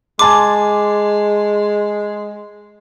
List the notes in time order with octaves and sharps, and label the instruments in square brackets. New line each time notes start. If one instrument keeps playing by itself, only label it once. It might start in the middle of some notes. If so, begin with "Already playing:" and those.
[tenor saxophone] G#3 [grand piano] G#5 A5 C6 [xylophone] D6